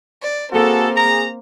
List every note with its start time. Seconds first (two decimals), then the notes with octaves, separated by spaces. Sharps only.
0.21 D5
0.53 A#3 C4 F#4 G#4 A4
0.95 G#4 A#5